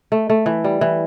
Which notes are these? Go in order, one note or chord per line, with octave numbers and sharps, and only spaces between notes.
A3
A3
E3
G3
E3